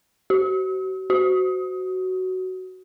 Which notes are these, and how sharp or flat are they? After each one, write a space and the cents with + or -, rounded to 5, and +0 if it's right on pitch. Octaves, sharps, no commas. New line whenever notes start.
F#4 +40
F#4 +10